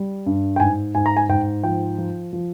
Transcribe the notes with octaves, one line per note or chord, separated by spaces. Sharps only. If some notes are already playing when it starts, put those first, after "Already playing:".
Already playing: G3
G2
G5
G#2 G#5
G#2 G#5
A#5
G#5
G#2 G5
F3 G5
F3
F3